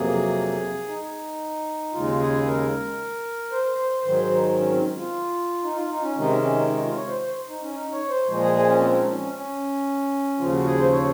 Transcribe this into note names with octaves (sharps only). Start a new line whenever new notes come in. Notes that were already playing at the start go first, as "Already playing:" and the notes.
Already playing: F2 C3 F#3 A#3 G#4
D#4
D#2 C#3 G#3 F4
G#4
A#4
C5
C5
G#2 D#3 F#3 C5
D#4
C#4
C4
F4
D#4
F4
D#4
C#4
C3 D#3 G#3 D#4
C#4
C#4
D#4
D#4
F4
C#5
C5
C5
D#4
C#4
D#4
C#5
C5
A#2 F3 G#3
G#4
G#4
C#4
C4
D#4
C#4
C#4
D#2 C#3 F3 F4
F#4
G#4
C5
C#5